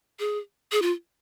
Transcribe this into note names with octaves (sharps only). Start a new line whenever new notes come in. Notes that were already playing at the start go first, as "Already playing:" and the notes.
G#4
G#4
F4